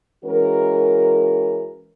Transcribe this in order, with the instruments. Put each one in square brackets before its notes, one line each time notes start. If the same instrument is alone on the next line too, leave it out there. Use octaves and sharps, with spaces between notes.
[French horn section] E3 G#3 C#4 F#4 A#4